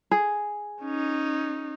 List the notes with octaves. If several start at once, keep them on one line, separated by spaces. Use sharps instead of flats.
G#4
C#4 D#4